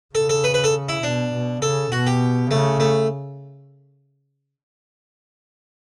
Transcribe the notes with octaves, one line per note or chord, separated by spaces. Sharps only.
C#3 A4
A4
B4
B4
A4
E4
B2 D4
B2
C#3 A4
B2 F#4
G4
C#3 A3
A3